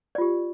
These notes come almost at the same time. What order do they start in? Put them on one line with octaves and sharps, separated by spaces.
D5 F4 G4